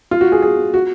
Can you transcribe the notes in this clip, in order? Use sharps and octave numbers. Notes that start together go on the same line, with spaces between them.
F4
F#4
G#4
G#4
F#4